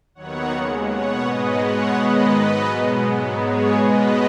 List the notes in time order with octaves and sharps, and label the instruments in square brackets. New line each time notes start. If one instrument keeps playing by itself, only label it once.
[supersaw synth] D#2 D#3 F#3 B3 C#5 F#5
D#2 C#3 G#3
B2 B3 C#5 F#5
G#2 G#3 B3 B4 D#5
B2 G#3 B3 C#5 F#5
G#2 D#3 G#3 B3 B4 D#5
G#2 F#3 B3 B4 D#5
B2 G#3 B3
G#2 F#3 B3
G#2 G#3 B3 G#4 C#5
B2 G#3 B3 B4 D#5